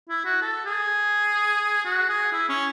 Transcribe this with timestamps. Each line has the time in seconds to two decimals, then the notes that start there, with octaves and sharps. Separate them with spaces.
0.09 E4
0.25 F#4
0.42 A4
0.65 G#4
1.85 F#4
2.09 G#4
2.32 E4
2.49 C#4